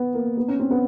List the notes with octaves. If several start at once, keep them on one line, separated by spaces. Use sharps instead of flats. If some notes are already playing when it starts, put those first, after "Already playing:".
Already playing: B3
A#3
B3
C#4
C4
B3